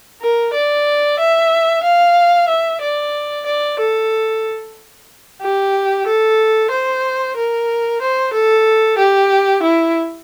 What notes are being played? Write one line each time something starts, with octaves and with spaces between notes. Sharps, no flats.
A#4
D5
E5
F5
E5
D5
D5
A4
G4
A4
C5
A#4
C5
A4
G4
E4